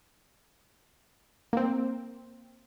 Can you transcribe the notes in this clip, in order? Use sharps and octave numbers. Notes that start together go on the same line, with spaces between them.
A#3 C4